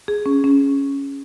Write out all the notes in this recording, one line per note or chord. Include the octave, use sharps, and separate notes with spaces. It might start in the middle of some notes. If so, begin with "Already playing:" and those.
G#4
C#4
C#4